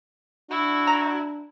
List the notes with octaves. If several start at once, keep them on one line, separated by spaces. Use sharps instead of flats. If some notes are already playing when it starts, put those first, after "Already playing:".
D4 E4 F#4
A#5